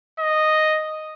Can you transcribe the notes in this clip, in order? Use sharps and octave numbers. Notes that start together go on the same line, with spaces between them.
D#5